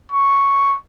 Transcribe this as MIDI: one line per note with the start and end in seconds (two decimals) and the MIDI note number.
0.12 0.77 85